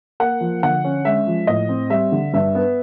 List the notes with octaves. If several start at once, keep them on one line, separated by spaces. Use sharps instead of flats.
A#3 F#5
F3
D3 F#5
C#4
G#3 E5
F3
A2 D#5
C4
G3 E5
D3
G2 E5
B3